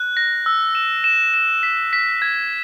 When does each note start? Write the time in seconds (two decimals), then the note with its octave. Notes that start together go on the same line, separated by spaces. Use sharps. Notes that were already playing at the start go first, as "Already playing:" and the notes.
Already playing: F#6
0.17 A#6
0.46 E6
0.75 E7
1.04 E7
1.34 E7
1.63 B6
1.93 B6
2.22 G#6